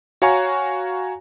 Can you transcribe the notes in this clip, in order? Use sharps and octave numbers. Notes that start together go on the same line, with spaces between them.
F#4 C#5 F5 G#5 A#5 C#6